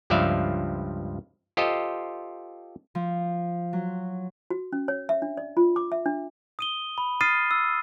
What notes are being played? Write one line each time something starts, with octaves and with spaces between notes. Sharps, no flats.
C#2 G2 F3 D5 E5 F5
F4 G4 A4 C5 D#5
F3
F#3
F#4
C#4
C#5
E5
D4
D5
F4
D6
E5
D4
D#6 D#7 G7
B5
D#6 F6 A6 C7 D#7
E6